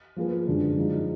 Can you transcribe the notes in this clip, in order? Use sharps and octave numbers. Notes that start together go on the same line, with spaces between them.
F3 A#3 F4 G#4 B4
F#2 D3 G#3 D4
F3 G#3 D#4